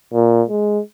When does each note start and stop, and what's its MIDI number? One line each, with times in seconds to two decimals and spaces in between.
0.14 0.43 46
0.49 0.80 56